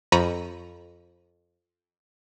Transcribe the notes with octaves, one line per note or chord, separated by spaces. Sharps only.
F2 A#5 B5 C#6 B6 D#7